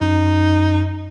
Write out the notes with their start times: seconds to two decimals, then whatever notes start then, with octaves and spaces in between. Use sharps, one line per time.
0.01 F#2 D#4